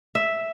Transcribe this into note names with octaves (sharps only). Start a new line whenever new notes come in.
E5